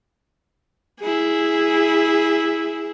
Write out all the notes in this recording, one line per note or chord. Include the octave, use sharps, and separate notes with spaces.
E4 G#4